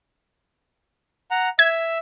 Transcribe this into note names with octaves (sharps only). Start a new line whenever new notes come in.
F#5 A#5
E5 E6 G#6